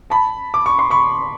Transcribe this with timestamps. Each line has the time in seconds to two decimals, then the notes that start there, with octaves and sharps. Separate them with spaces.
0.10 A5 B5
0.54 D6
0.66 C#6
0.79 C6
0.90 B5 C#6